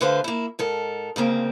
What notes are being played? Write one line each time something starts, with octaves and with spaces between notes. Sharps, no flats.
D2 D3 B4 C5 F5
A#3 E4
G#2 A4 A#4
D2 C#3 A#3 C4